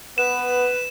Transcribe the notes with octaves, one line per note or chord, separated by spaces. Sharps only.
B3 B4 E7